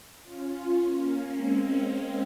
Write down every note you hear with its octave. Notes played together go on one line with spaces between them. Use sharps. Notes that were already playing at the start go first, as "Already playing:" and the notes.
C#4 F4
A#3 C#4
G#3 C4